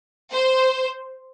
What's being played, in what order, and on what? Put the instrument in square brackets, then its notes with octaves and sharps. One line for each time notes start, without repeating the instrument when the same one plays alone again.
[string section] C5